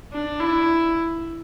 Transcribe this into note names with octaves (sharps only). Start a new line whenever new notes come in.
D4
E4